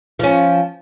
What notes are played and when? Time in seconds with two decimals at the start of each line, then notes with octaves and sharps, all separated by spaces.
0.19 F3 C#4